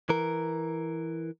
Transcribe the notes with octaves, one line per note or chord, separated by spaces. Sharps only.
E3 A#4